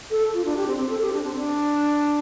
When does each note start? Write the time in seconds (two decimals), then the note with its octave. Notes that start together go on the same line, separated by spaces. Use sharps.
0.11 A4
0.34 F4
0.45 D4
0.57 G4
0.68 C4
0.79 C4
0.90 A4
1.01 G4
1.13 D4
1.24 C4
1.35 D4